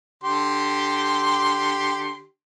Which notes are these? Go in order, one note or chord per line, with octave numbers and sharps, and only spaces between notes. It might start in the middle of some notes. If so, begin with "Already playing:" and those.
D3 G4 C6